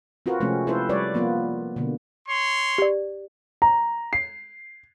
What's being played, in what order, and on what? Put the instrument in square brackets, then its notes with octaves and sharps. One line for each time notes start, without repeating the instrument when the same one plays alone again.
[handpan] C4 F4 F#4 A#4 B4
C3 F3 G#3 A3 C4 C#4
C4 E4 F4 A4 B4 C5
G3 B4 C#5 D5
F3 A#3 B3 F4 B4
B2 D3 A#3
[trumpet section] C#5 C6
[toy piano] G4 D5
[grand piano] A#5
C7